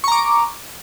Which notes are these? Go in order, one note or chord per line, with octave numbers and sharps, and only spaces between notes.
A#5 C#6 D6